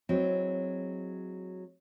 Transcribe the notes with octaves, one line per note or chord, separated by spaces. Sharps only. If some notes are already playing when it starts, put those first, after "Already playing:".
F#3 G#3 C4 E4